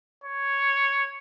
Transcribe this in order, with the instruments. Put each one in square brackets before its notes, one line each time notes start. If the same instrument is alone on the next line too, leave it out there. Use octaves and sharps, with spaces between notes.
[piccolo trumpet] C#5